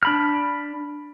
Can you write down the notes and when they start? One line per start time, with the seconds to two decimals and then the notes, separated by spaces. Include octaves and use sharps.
0.03 D4 B5 F6